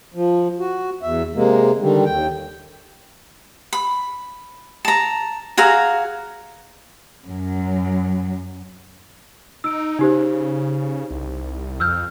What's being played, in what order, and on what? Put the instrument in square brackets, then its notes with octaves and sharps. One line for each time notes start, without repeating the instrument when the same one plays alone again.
[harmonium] F3
F#4
E2 E5
C3 G#3 A#3
D3 D#3 G3
D#2 G5
[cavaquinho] B5
A5 A#5
F#4 G#4 F5 A#5
[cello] F#2 F#3
[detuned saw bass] D#4 [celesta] E6 D7
[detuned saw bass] C#3 [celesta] D#4 G4 C5
[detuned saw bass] C2
[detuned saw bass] F2 [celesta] E6 F6 G6